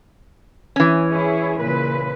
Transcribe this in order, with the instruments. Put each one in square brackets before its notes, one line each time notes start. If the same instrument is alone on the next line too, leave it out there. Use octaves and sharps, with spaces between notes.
[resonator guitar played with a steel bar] E3 C#4
[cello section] E4 G#4 C#5
A#2 C#3 B4